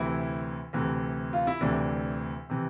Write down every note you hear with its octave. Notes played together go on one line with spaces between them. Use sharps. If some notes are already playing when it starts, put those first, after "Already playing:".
Already playing: D2 C3 E3 E4
D2 C3 E3
F4
E4
D2 C3 E3 D4
C3 E3